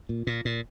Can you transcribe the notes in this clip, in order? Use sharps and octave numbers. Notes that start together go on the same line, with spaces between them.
A#2
A#2
A#2